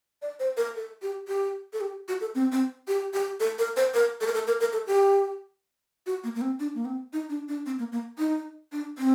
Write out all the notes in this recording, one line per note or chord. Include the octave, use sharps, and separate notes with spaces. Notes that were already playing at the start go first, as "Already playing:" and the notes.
D5
C5
A#4
A4
G4
G4
A4
G4
F#4
A4
C4
C4
G4
G4
A4
A#4
C5
A#4
A4
A#4
A4
A#4
A#4
A4
G4
F#4
A#3
A#3
C4
D4
A#3
C4
D#4
D4
D4
C4
A#3
A#3
D#4
D4
C4